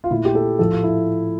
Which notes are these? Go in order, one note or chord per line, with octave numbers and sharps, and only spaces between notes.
F4
A#2 A3 E4
G4
A4
A2 F3 A3 A4
F4
E4